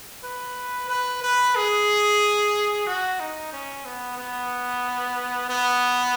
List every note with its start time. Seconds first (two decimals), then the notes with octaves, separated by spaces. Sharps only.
0.23 B4
0.89 B4
1.23 B4
1.56 G#4
2.87 F#4
3.20 D#4
3.53 C#4
3.85 B3
4.18 B3
5.50 B3